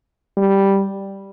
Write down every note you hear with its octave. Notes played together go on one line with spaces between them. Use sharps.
G3